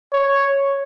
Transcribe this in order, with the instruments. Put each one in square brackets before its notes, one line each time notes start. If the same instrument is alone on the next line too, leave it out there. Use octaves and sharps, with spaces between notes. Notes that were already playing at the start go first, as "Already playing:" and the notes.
[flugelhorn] C#5